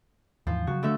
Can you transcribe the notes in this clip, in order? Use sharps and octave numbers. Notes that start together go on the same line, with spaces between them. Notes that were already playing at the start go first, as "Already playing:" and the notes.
D#2 G#2 E3 F3
C#3 F#3 F#4
D3 A3 E5